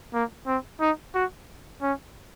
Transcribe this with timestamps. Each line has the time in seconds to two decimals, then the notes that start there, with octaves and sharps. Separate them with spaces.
0.14 A#3
0.47 C4
0.81 D#4
1.15 F#4
1.82 C#4